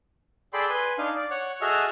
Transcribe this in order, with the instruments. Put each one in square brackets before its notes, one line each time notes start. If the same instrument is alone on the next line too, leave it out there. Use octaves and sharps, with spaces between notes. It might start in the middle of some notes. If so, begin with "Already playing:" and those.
[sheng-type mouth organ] G#4 A4 D5 G5 B5 C6
B4 G#5 C6
D4 D#4 F5
D5
C#5 F#5
F#4 G#4 A4 D#5 E5 F6